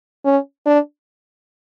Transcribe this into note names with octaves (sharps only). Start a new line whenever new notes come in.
C#4
D4